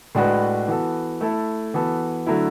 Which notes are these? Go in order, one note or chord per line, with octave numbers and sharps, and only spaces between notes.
A2 G#3 D4 F#4 B4
E3 B3 F#4 A4
A3 E4 A4
E3 B3 F#4 A4
D3 F#3 A3 E4